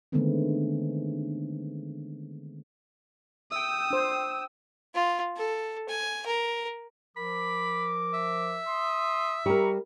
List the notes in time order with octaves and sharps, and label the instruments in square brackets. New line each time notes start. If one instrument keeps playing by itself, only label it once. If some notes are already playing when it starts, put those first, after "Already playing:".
[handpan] D3 D#3 G#3 A3 B3 C4
[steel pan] E5 [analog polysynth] G5 E6 [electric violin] D#6
[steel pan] D4 C5
[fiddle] F4
A4
G#5
A#4
[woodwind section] F3 A#4 [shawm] B5 [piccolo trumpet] D6
[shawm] E5
[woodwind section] C6 [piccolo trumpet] D#6
[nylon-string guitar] G3 A#4 [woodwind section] A#5 B5 C#6